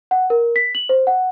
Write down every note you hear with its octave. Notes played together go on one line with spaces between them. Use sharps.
F#5
A#4
B6
F#7
C5
F#5